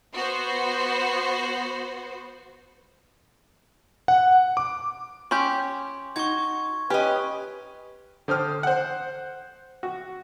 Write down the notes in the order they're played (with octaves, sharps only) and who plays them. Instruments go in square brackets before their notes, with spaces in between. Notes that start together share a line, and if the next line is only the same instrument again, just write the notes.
[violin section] B3 F#4 C5
[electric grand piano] F#5
D6
[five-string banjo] C#4 G4 [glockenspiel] C6
[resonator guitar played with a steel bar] D#4 F#4 [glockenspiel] C#6 G#6
[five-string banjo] C#4 [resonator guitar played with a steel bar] G4 D#5 [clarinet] B4
[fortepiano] D3 C5 D#6 F6
C5 F#5
F#4